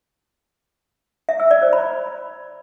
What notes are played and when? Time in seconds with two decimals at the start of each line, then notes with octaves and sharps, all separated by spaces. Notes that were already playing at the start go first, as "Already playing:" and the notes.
1.29 E5
1.40 E6
1.51 D5
1.62 C5
1.73 B5